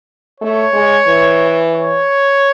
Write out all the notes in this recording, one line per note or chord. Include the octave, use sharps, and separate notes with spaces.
A3 C#5
G#3
E3
C#5